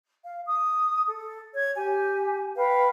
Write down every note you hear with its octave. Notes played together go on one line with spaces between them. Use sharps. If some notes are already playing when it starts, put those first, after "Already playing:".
F5
D#6
A4
C#5 G#6
G4 G#5
B4 F5 G5